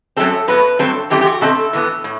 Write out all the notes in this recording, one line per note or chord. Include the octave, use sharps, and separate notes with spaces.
F#2 F#3 A3 C4 A4
A2 F#3 B3 B4
G2 F#3 A3 C4 A4
F#2 E3 A3 C4 G4
G4
F#4
B2 A3 C4 A4
A2 E3 B3
A2